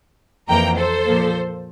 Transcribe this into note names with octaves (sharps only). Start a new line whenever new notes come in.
F2 E3 A#3 G5 A#5
A4 C5
A#2 F3 A#3